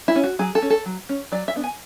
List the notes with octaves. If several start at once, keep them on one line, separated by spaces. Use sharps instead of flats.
E4
C#4
F#4
F#3 G#4
A4
C#4
A4
F#3
C#4
F#3 D5
E5
B3 D4
G#5